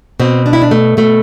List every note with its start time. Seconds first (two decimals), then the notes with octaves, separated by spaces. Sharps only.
0.20 B2 C4
0.46 D4
0.53 E4
0.62 D4
0.71 A3
0.97 B2 A3